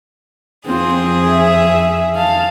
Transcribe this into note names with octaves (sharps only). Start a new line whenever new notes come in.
F2 C4 F4 G#4
C4
E5
F5 A5